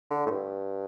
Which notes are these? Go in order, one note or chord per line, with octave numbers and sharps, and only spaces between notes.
D3
A2
G2